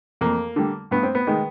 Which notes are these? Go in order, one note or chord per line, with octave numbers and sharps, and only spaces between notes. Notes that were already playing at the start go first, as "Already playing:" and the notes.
F2 A#3
D3 G3
G2 B3
C4
B3
D#3 G#3